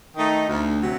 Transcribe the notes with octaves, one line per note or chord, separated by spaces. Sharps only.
D#3 A3 D#4
D2
C3 F#3